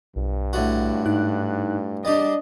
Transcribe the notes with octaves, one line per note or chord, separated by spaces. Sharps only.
B1 G2
A2 D3 F#4
G#2 D#4 F#6
G3 D4 G4 D5 D#5